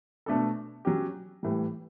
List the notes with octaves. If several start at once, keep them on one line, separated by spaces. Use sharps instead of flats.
B2 A3 D4 A4
F#3 C#4 G4
A2 E3 G3